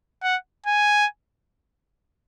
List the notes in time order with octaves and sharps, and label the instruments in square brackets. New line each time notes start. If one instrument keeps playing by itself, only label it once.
[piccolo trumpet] F#5
G#5